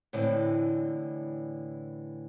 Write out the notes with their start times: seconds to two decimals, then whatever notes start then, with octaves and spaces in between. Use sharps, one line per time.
0.13 A2 D3 E3 G#3 C4